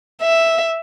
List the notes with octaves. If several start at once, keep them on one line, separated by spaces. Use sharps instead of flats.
E5